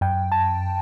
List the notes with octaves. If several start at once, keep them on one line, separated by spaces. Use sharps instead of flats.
F#2 G5
A5